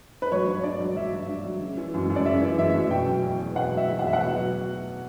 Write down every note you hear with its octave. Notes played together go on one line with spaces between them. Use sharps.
B4
F#3 C#5
G2
G2 D5
F#3
F#3 E5
G2
G2
F#3
C#3
E3
F#2
F#2
D5
C#3 E5
E3
F#2 E5
F#2
B2 G5
F#3
E2
E2
B2 F#5
F#3
E5
E2
F#5
E2 E5
F#5
B2
F#3